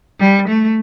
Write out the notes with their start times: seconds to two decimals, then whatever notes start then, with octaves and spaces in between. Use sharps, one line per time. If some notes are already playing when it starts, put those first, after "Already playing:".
0.19 G3
0.48 A3